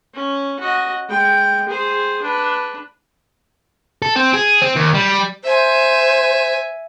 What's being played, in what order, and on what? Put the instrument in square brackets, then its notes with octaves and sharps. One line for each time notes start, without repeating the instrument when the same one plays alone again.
[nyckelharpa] C#4
F#4 D#5
G#3 G5
G#4 C5
D4 B4
[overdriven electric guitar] A4
C4
G#4
C4
D#2
G3
[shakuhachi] C5 [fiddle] E5 G#5